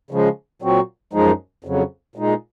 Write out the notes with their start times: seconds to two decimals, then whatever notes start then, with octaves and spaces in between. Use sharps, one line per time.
0.11 C#3 F3 G#3
0.62 A#2 F#3 C4 F#4
1.13 F#2 F3 G#3 D#4
1.64 F2 C#3 F#3
2.16 A#2 G#3 D#4